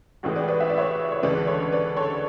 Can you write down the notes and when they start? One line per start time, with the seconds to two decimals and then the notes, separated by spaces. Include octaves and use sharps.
0.23 A1 A2 E3 G#3 F#4
0.35 B4 D5
0.48 B4 D5
0.60 E5
0.70 D5
0.78 C#5 E5
1.12 C#5
1.22 D2 C#3 E3 G#3 D4 B4 D5
1.47 A4 C#5
1.72 B4 D5
1.97 A4 C#5